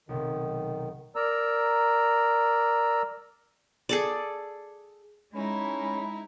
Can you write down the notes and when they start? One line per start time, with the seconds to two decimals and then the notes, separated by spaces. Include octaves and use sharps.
0.09 B1 C3 D#3
1.16 A#4 D5 A#5 E6
3.89 G#4 A4 D5
5.35 G#3 C#4 D#4 E4 B5